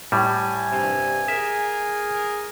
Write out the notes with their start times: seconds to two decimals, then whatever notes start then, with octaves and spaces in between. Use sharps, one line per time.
0.12 A2 G3 G#5
0.72 G2 C3
1.28 G#4 A#4 E5